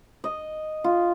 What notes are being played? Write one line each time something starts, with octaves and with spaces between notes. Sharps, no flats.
D#5
F4